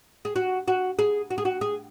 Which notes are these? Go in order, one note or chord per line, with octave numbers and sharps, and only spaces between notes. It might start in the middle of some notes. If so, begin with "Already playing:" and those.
G#4
F#4
F#4
G#4
F#4
G#4
F#4
G#4